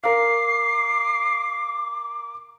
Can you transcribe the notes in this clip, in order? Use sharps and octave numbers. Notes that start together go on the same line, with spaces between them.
A#4 F5 D6 C7